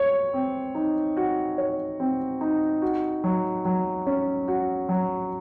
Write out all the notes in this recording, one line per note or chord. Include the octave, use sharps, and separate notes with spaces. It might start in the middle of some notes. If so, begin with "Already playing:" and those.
Already playing: C#5
C4
D#4
F#4
C#5
C4
D#4
F#4
F#3
F#3
C#4
F#4
F#3